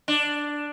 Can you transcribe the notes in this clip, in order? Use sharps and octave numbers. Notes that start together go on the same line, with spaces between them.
D4